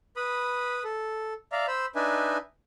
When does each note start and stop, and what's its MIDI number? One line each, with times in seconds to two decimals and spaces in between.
0.16 0.83 71
0.16 0.83 83
0.16 0.83 87
0.84 1.34 69
1.52 1.66 74
1.52 1.66 76
1.52 1.66 77
1.52 1.66 82
1.68 1.86 72
1.68 1.86 83
1.68 1.86 88
1.95 2.38 62
1.95 2.38 63
1.95 2.38 71
1.95 2.38 76
1.95 2.38 80